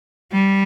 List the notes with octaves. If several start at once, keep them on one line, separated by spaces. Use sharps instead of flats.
G3